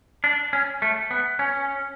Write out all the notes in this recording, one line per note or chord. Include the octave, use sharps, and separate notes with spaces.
D4
C#4
A3
B3
C#4